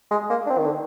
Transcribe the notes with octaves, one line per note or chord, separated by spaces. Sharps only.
G#3
A#3
D4
C4
D#3
D3